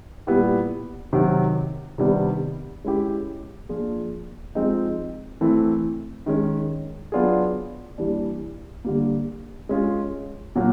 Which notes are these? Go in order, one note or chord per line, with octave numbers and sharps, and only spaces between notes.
A#2 G3 B3 E4 G4
C3 D#3 F#3
C3 D#3 G3 B3 D4
G#3 C#4 E4 G4
F3 A#3 D4 F4 G#4
F3 G#3 C4 D#4
E3 A3 C4 E4
D#3 G#3 C#4
F#3 B3 D4 F4 G#4
E3 G3 A#3 D4
D3 G3 A#3
G#3 C#4 F4 G#4
A#2 F#3 A#3